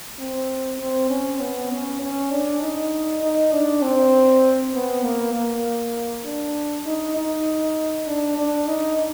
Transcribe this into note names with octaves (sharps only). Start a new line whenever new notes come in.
C4
C4
C#4
B3
C#4
C#4
D4
D#4
D#4
D4
C4
B3
A#3
A#3
D4
D#4
D#4
D4
D4
D#4